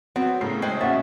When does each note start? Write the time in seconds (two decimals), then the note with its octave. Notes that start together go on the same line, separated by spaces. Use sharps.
0.16 F#3 B3 C4
0.41 A2 C#3 A#4 C7
0.62 G#3 C5 G5
0.81 A#1 B2 C#4 E5 F#5 A6